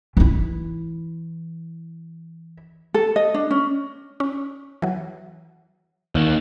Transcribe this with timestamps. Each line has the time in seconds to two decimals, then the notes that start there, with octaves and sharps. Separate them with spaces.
0.17 E3 E4
2.94 A4
3.16 D#5
3.34 D4
3.51 C#4
4.20 C#4
4.82 E3 F#3
6.15 D#2